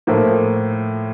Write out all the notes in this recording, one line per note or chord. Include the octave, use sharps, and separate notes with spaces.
A2 F3 A#3